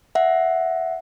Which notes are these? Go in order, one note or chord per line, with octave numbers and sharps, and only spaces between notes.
E5 F#5